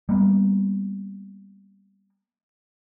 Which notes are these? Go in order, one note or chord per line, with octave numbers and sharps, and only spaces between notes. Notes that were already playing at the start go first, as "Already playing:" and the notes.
G3 A#3 B3